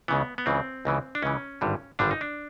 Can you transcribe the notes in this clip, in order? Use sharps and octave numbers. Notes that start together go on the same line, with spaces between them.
C#2 C#3 E3 B3
B3
C#2 C#3 E3 C4
C#2 C#3 E3
D4
C#2 C#3 E3 C#4
G#1 G2 D3 G3
G#1 G2 D3 G3 D4
D#4
D4